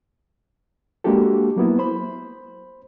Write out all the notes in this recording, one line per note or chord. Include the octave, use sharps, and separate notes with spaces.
G#3 A#3 D4 F#4 G4 A4
F#3 A#3 B3 E4
C5 B5